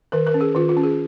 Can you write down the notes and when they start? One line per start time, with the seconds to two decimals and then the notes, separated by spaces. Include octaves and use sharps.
0.12 D#3 A#4
0.27 A#4
0.34 C#4
0.41 G#4
0.55 D#3 F4
0.69 F4
0.77 C#4
0.84 G#4